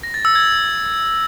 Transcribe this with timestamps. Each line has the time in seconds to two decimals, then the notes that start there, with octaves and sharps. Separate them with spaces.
0.03 A#6
0.14 A6
0.25 E6
0.35 G#6